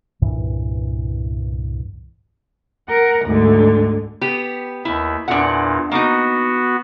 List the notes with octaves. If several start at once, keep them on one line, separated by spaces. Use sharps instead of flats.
C2 G2 A#2 E3
A#4 F#5
D2 G#2 D3
B3 G4
D#2 E4
E2 A#2 D4 F#5
A#3 B3 D#4 F#4